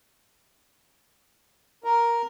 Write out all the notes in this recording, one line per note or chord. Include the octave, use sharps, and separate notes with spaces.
A#4